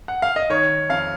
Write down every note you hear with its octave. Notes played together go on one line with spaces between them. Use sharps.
F#5
F5
D#5
D#3 C#5
F2 F5